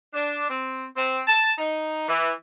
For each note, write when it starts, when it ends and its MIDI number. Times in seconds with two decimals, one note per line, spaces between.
0.14 0.47 62
0.49 0.85 60
0.96 1.21 60
1.27 1.51 81
1.58 2.04 63
2.07 2.30 52